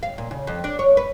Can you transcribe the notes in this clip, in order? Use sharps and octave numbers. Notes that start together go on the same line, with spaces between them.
F5
A#2
C#3
F2
D4
C#5
B4